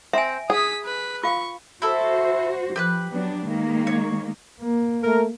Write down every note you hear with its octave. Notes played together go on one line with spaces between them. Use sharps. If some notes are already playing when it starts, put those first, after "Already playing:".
C4 E5 G#5
G#4 D#6 B6
B4 B6
F4 F5 C#6
E4 F#4 A4 C5
F3 G4 B4 F#6
F#3 B3 D4
D#3 G#3 A#3
C#5
A#3
A3 A#4